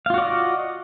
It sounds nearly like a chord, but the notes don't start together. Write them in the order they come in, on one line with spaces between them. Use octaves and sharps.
F5 F4 F#4 D5 D#5